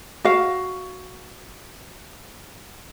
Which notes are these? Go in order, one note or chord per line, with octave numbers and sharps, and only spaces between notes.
F#4 F5